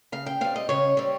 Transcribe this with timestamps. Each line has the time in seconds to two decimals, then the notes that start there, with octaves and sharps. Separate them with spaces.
0.12 C#3 F5
0.26 G5
0.41 G3 C4 F5
0.56 D#5
0.69 C#3 C#5
0.97 G3 C4